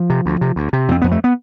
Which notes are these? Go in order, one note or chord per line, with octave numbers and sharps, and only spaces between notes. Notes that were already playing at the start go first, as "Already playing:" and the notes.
Already playing: F3
C3
D2
C3
D2
C3
F2 C4
F2 B3
A3
B3